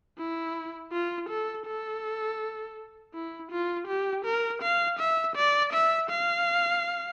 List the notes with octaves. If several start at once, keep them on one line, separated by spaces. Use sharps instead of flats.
E4
F4
A4
A4
E4
F4
G4
A#4
F5
E5
D5
E5
F5